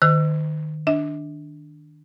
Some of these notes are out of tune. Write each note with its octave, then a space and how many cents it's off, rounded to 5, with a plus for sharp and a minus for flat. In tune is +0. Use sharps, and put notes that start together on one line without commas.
D#3 -20 C5 -45 E6 +30
D4 +0 E5 -45